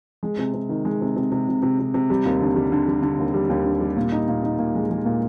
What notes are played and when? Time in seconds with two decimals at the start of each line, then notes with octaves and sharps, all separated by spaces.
0.23 G#3
0.38 C3
0.54 C3
0.69 D#3
0.85 G#3
1.01 C3
1.16 C3
1.32 C3
1.48 C3
1.62 C3
1.79 C3
1.94 C3
2.10 G3
2.25 D#2
2.41 D3
2.56 G3
2.72 D3
2.87 G3
3.03 D3
3.19 D#2
3.34 G3
3.50 D#2
3.66 D3
3.81 G3
3.97 A#2
4.12 D#4
4.28 A#2
4.43 D#4
4.59 A#2
4.75 G#3
4.90 G#3
5.05 A#2